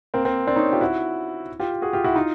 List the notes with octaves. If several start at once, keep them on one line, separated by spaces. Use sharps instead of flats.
A#3 C4
A#3 C4
C4 D4
C#4 D#4
F4 G4
E4 F#4
F4 G4
F#4 G#4
F4 G4
E4 F#4
D#4 F4